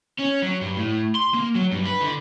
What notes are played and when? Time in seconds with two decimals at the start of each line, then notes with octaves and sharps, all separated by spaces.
0.19 C#4
0.43 F#3
0.61 G2
0.77 A2
1.15 C6
1.34 A#3
1.55 F#3
1.72 G2
1.86 B4
2.01 D3